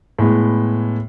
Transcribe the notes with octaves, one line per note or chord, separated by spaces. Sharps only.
A2 G#3 B3